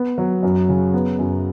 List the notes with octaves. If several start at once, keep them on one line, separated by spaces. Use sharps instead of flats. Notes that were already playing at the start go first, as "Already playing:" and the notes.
Already playing: B3
F#3
F#2
C#3
B3
F#2